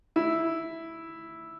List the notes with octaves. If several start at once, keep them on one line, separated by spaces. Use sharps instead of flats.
E4